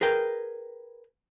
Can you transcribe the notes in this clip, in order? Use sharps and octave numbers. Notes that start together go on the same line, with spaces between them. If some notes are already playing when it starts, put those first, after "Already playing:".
G#4 A#4 B4 G5